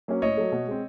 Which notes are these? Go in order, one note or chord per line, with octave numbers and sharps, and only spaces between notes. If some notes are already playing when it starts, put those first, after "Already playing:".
F#3 A#3 C#4
A2 C#5 D#5
F#3 A3
B2
G#3 C4